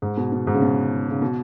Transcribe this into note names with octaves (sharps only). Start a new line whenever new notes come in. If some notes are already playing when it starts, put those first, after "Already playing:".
G#2
B2
B2
G#2
C#3
B2
C#3
B2